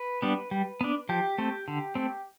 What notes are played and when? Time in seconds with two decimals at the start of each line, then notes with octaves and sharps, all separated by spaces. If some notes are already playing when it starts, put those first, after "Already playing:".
Already playing: B4
0.22 G3 B3 D4
0.51 G3
0.81 B3 D4
1.09 F3 G4
1.38 A3 C4
1.68 D3
1.95 A3 C4